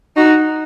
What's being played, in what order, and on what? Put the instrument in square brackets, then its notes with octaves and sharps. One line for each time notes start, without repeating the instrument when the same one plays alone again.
[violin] D#4 [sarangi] F#4